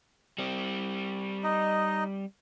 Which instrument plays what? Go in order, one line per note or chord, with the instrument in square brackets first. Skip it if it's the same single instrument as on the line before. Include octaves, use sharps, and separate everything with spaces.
[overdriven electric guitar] G3 C4
[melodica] D#4 D#5